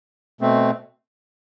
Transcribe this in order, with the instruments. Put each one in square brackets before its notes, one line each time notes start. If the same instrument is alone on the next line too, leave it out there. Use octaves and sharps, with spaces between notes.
[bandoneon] B2 A3 C4